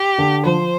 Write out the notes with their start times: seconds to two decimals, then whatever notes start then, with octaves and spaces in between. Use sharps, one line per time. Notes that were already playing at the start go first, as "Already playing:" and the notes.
Already playing: G4
0.18 D3
0.45 F3 C5